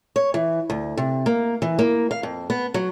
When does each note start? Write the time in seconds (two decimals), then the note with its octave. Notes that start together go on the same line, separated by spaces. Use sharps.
0.16 C#5
0.34 E3
0.70 D2
0.97 C3
1.26 A#3
1.62 E3
1.79 A#3
2.11 F5
2.23 F2
2.50 B3
2.74 F#3